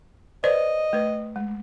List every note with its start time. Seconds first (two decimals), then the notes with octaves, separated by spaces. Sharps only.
0.44 B4 C5 D5 D#5
0.93 A3 B4
1.36 G#3